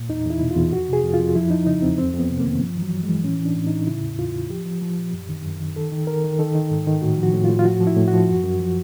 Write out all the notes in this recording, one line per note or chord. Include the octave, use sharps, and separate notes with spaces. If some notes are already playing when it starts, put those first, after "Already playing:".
Already playing: A#2
E2 D#4
E2 E4
B2
F4
E2
F2 F#4
C3 G#4
F2
F4
F2
F3 E4
F3 D#4
C#3 D#4
E2 C4
F2 C4
F2
B3
C3
A#3
D#3
G2 F3
E3
F#3
G2
E3 G#3
A2 C#4
E3
D4
A2
A2 D#4
C#3 E4
E2
E2 F4
E2
F3 G4
F3
F3
A#2
F#2
D#3
F#2
D#3
D#3 A4
D#3
D#3 A#4
D#3
D#3 A4
D#3
G#2
D#3
A2 F#4
F3
F#4
A2
F4
A2
F4
F3 F#4
F3
E4
A2
F#4
F3
F#2
F#2
F3